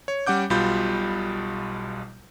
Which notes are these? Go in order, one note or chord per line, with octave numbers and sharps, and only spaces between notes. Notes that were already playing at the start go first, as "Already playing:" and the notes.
C#5
G3 C#4 F#5 D6 G6
B1 B2 G3 F4 B5 G6